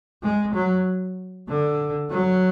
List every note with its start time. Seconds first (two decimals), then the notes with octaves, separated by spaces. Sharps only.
0.23 G#3
0.54 F#3
1.49 D3
2.11 F#3